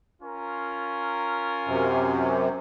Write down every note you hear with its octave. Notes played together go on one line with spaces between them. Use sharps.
C#4 F4 A#4
F#2 C3